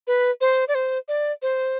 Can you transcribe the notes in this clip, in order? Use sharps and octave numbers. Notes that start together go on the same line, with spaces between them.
B4
C5
D5
C5
D5
C5